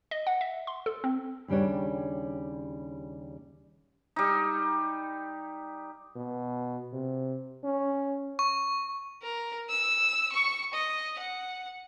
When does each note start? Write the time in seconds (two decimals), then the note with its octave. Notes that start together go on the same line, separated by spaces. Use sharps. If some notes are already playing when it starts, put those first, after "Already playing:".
0.11 D#5
0.27 F#5
0.41 E5
0.67 C6
0.86 A4
1.04 C4
1.48 D#2 C#3 G3 D4 C#5
4.16 G3 D#4
6.16 B2
6.93 C3
7.64 C#4
8.39 C#6
9.22 A#4
9.69 E6
10.32 C#6
10.73 D#5
11.18 F#5